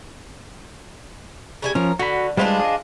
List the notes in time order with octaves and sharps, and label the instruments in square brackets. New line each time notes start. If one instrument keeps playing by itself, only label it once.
[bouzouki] C#3 G3 G#5
[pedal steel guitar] F3 C#4 [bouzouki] A#4
[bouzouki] D3 [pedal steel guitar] F#4 B5
[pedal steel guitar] G3 G#3 B4 [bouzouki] D4 F4 C5
[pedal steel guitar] G#4 D#5